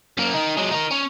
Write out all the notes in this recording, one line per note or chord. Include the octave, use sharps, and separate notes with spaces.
F#2 A#3
D#3 D#4
F#3 G#3
D#4 A#4
C#4